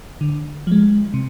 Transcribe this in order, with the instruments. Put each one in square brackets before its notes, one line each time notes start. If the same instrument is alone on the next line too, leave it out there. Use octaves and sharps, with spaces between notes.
[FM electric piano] D3
F3 G#3
C3